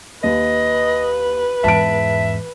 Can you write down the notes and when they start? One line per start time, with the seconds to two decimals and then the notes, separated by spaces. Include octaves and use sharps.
0.24 D#2 B4 D#5
1.64 E2 G#2 E5 A5 D7